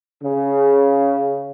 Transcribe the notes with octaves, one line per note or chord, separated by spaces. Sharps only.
C#3